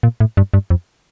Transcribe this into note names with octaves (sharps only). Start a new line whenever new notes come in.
A#2
A2
G2
G2
F2